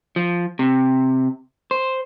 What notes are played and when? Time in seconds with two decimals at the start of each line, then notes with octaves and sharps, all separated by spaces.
0.16 F3
0.59 C3
1.71 C5